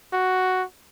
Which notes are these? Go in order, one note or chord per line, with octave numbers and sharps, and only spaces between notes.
F#4